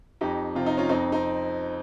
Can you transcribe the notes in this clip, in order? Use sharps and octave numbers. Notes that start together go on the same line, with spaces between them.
F2 D#4 G4
C3 F3 F4
D#4
C#4 F4
F2 C4 D#4
C4 D#4